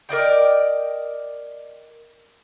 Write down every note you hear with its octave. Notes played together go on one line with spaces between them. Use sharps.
A#4 D5 D#5 G5